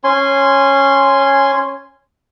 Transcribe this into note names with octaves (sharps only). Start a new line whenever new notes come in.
C#4 G#5 C6